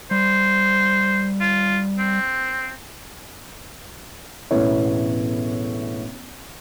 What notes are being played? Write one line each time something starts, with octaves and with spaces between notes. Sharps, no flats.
G3 C5
F4
C4
E1 A1 A2 B3 E4 C#5